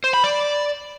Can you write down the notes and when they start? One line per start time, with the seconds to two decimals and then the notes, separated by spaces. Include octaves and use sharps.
0.04 C5
0.14 B5
0.24 D5